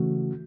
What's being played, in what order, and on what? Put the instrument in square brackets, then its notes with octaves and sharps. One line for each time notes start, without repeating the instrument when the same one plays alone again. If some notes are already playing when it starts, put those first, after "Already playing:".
Already playing: [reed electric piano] C#3 E3 A3 C#4 F#4